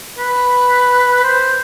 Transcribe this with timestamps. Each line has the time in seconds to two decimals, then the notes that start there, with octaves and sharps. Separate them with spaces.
0.19 B4
1.24 C5